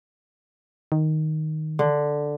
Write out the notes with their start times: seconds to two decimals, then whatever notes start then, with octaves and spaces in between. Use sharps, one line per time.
0.92 D#3
1.79 D3